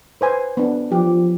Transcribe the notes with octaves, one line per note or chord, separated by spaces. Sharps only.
B4 C5 G#5
B3 D4
F3 G4